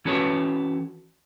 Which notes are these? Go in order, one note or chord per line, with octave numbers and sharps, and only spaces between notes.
E3 C#4 F#4 A4 B4 C#5